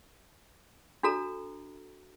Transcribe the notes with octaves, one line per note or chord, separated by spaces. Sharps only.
D4 F#4 A4 A#5